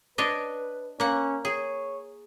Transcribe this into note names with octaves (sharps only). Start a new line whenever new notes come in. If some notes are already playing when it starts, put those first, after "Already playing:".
D4 B4 C#5 D#5
A#3 C#4 F#5
G#4 C#5